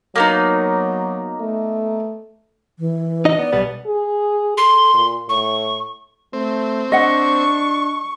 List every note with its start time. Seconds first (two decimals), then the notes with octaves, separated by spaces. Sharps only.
0.16 F#3 A#3 B3 D#4
1.40 A3
2.79 E3
3.25 D#4 D#5
3.39 B3 D5
3.53 B1 G3 B3
3.86 G#4
4.58 A4 C6
4.94 A#2
5.29 A2 C#6
6.33 A3 C4
6.92 D4 D#5 F#5 C#6